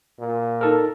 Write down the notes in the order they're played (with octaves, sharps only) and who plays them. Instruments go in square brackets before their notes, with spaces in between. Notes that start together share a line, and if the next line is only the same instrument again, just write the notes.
[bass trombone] A#2
[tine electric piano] D#4 A4 A#4